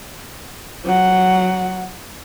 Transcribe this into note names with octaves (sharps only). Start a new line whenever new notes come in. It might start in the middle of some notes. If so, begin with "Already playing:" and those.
F#3 F#5